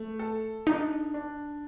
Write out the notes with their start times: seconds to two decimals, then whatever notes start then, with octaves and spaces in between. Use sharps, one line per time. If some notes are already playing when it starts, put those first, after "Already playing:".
Already playing: A3
0.19 A4
0.67 D4 D#4
1.14 D4